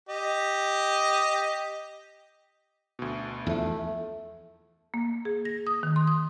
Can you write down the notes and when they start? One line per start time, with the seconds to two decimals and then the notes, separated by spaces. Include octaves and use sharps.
0.09 G4 D#5
2.99 D2 B2
3.47 E2 F3 A3
4.94 A#3
5.25 G#4
5.45 A#6
5.67 D#6
5.83 D#3
5.96 C6
6.07 D#6